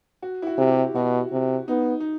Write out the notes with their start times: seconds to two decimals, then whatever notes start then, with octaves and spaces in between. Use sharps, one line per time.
0.22 F#4
0.42 E4
0.47 F#4
0.58 C3
0.70 G4
0.95 B2 F#4
1.32 C3
1.68 B3 D#4
2.00 D#4